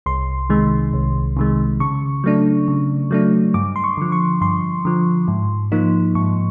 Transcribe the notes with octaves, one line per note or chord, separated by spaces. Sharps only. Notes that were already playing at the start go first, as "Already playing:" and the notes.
C2 C6
C3 D#3 G#3
C2
C3 D#3 G#3
C#3 C#6
F#3 A3 D4
C#3
F#3 A3 D4
G2 D6
C6
C#6
D3 F3
C#6
G2 C6
D3 F3
G#2
F3 A#3 D#4
G#2 C#6